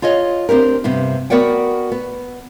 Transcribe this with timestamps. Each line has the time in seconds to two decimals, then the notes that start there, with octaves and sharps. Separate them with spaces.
0.02 F4 G#4 C#5 D#5
0.49 C4 D4 G4 A#4
0.84 G2 C3 B3
1.30 B3 F#4 A#4 D5 F#5 G5
1.92 B3